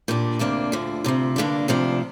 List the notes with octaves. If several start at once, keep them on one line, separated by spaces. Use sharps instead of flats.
A#2 G3 D4
D2 C3 A#3 D4
D2 D3 F3
D2 C3 F3
G2 D3 A#3 D4
D2 C3 F3 D4